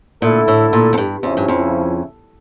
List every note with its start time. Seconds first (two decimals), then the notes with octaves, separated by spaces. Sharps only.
0.22 A#2 D3 A3 E4 A4
0.48 A2
0.73 A#2
0.93 F2
0.98 G2
1.23 F2 C#3 F3 C#4 E4
1.37 G2
1.48 F2